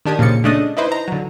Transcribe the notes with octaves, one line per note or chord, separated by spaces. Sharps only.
D#3 D4 G4 D#6 G#6
A#2 C#3 F3 A6 C#7
C#3 A3 D4 D#5 D#6 F#6
D#4 E4 B4 C5
A#5
D3 F#3